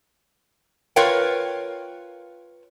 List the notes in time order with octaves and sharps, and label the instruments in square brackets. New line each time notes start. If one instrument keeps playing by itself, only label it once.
[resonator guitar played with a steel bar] F4 A#4 B4 C#5 F5 G5